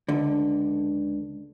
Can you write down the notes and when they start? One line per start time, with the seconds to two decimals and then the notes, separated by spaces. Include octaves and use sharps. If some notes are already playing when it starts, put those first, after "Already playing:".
0.08 C#2 D3